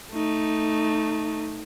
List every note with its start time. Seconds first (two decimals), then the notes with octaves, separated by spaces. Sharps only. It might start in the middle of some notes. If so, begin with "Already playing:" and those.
0.12 A3 D#4